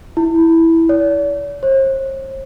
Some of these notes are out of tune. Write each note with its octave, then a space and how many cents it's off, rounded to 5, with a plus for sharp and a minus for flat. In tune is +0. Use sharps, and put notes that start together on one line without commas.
E4 -5
D5 -45
C5 +45